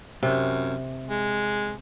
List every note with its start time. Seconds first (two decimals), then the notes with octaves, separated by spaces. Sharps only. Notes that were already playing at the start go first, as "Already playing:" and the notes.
0.23 F#2 C3
1.10 G#3